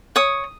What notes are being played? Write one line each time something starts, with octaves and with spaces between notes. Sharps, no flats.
C#5 D#6